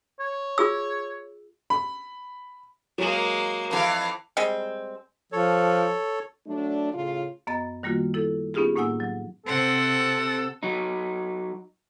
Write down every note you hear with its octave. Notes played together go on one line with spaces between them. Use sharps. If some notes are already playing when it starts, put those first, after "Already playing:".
C#5
F4 G#4 E6
B5
F#3 G#3 A#3
F2 D#3 E3 F5
G3 G#3 C4
F3 A4 C#5
F#3 A3 D4
A2 C#3 F4
F#2 B3 D#5 A#5 A6
D#3 G3 A#3 F4 F#4
E4 A4
B3 C#4 D#4 F4 G4 G#4
A2 A#3 D#4 F#5 G#5 E6
F#3
C3 C4 A4 F#5
F#3 D#4